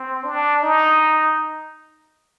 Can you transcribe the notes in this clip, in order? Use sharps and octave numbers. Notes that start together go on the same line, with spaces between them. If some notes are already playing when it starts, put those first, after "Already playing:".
Already playing: C4
D4
D#4